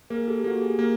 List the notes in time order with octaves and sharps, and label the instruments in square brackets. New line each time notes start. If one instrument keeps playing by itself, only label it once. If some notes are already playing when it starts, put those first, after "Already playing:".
[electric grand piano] A#3 [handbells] G#4 A#4
[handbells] G4 A4
[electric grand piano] A#3 [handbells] F#4
[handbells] G4
G#4
[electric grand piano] A#3 [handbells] G4